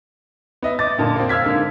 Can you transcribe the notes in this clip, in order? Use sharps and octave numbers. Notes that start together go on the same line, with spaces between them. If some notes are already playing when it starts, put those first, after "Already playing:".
B3 D#5 E5
D#5 D6 A6
F#2 A#2 D3 A5
A#3 C4
F5 E6 F6 G#6 B6
G#2 D3 A#3